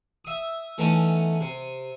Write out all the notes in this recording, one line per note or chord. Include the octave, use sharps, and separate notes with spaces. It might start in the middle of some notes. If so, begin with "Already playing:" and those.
E5 D#6
E3 A3 B3 C#4 D#4
C3